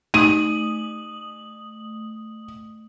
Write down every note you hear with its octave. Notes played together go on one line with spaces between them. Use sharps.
A3 D#4 D#6 D#7 F#7